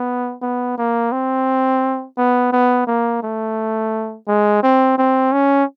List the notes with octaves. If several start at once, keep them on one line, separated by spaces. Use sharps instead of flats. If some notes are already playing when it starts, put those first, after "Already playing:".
Already playing: B3
B3
A#3
C4
B3
B3
A#3
A3
G#3
C4
C4
C#4